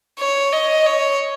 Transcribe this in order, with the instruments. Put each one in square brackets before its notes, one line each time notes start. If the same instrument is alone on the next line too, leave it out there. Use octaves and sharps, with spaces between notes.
[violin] C#5
D#5
C#5